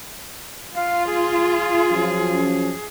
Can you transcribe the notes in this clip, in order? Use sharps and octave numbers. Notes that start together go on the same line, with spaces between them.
F4 F5
G#4
F3 F#3 C#4